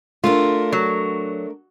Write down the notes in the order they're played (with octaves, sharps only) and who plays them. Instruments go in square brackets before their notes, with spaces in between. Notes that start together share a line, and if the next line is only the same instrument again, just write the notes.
[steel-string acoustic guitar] A3 D4 A#4 [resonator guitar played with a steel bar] F4
[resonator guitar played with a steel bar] F#3